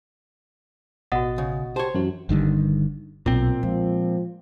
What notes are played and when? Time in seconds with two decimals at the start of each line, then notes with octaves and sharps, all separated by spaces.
1.12 A1 B2 F#4 D#5 F#5 A6
1.38 C#3
1.76 G4 C5 C#5 A5
1.95 F#2 E3 C#4 F#4
2.29 G1 D3 D#3 G3
3.26 B1 A#2 C4
3.63 F3 G#3